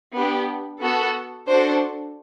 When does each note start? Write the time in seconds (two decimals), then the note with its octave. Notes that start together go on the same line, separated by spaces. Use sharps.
0.14 B3 D4 G4
0.81 B3 F#4 A4
1.48 D4 F#4 A4 C5